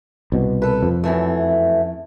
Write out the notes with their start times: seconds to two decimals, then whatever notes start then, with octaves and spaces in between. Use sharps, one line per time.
0.32 C2 B2
0.62 A4 B4
0.83 F2
1.04 F#2 E3 A3